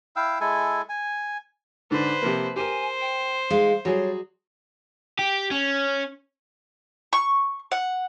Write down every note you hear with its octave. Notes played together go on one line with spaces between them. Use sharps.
E4 F5 G5 E6
G#3 E4 A4 G#5
G#5
G#2 D3 B4 C5
C3 F3 A#3
G4 A#4 C5 G#5
G5
G#3 D#4 F5
F#3 G3 G#4 C#5
G4
C#4
C#6
F#5